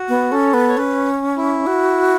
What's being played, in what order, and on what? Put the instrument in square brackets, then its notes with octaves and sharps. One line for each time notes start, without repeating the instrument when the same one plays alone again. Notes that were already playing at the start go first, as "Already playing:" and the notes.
Already playing: [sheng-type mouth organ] F#4
[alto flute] B3
[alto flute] C#4 [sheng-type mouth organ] A4
[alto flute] B3
[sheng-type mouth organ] C#5
[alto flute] C#4 [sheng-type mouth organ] B4
[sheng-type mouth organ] E4
[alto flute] F#4